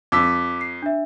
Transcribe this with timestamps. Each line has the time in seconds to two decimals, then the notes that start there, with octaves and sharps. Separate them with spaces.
0.12 F2 D6 E6 B6
0.61 C7
0.82 D4 E5